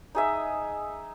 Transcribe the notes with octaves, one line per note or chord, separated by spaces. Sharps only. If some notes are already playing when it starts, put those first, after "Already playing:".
D#4 G#4 E5